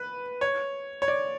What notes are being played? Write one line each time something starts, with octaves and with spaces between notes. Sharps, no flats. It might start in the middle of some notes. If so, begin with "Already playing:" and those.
Already playing: B4
C#5
C#5
D5